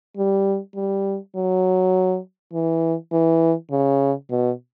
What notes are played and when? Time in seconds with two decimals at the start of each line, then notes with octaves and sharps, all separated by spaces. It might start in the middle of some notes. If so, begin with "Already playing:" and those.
0.17 G3
0.75 G3
1.35 F#3
2.53 E3
3.12 E3
3.71 C#3
4.30 B2